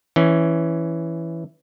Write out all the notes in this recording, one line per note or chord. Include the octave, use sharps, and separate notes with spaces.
E3 C#4